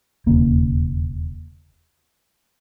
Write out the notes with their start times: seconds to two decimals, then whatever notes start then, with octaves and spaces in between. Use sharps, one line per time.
0.26 E1 D#2 C#3 A#3